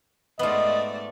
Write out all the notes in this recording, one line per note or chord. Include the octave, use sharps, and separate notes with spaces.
G#2 A3 B3 F4 D5 D#5